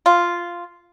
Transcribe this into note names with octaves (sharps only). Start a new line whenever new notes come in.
F4